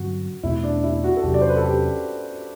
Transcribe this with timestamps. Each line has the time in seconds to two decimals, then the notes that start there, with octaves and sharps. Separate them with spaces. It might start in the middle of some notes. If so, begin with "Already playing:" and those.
Already playing: G2 D3 F#3 C4 F#4
0.43 E2 B2 A3 C4 E4
0.64 D4
0.84 E4
1.04 F#4
1.17 A4
1.23 E2 C3 F#3 G4
1.34 D5
1.42 C5
1.49 B4
1.56 A4
1.64 G4